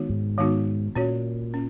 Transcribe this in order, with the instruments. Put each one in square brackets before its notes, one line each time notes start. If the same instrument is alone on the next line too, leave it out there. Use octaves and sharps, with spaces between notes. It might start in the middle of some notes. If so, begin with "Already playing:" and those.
Already playing: [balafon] D#3 G#3 B3 D#4 F#4
[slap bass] G#2
[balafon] D#3 G#3 B3 D#4 F#4
[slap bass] A#2 [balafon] C#4 F#4 C#5
[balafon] C#4